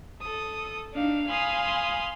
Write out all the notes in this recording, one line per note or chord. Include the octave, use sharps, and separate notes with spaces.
A4 D#6
D4 D#4 F5
F5 G#5 B5 C6 D#6